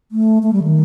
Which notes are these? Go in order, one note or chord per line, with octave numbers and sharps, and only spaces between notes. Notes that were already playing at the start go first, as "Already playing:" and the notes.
A3
A3
G3
D#3